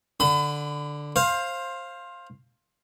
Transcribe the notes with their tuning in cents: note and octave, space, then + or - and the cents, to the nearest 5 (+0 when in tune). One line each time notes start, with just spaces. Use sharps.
D3 +0 B5 +35
C5 +20 F5 +0